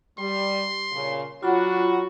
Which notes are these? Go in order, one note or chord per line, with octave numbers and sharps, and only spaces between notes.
G3 C6
A#2 C#3
F#3 D4 F4 F#4 B5